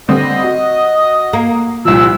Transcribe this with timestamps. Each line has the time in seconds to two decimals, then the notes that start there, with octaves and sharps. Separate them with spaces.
0.09 D3 G3 C4 D#5
0.43 F#4
1.33 A#3
1.85 C2 A#2 F3 E6